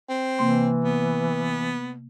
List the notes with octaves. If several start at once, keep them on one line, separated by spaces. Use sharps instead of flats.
C4
C3 E3 A#3 C6
B3